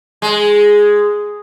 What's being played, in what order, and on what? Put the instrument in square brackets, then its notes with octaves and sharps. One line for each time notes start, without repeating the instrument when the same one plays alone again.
[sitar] G#3